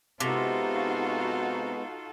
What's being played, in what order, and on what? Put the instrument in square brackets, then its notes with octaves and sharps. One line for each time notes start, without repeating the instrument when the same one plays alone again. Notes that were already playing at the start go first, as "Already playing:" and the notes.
[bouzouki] C3 [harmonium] G#3 B3 [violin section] D#4 F#4 F5 [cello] F4 A4